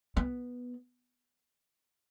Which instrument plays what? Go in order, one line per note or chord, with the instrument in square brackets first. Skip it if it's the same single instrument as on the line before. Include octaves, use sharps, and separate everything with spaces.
[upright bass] B3